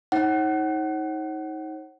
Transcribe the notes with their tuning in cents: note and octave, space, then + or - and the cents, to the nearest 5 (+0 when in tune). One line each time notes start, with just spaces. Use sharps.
D#4 +25 C#5 -45 F#5 +25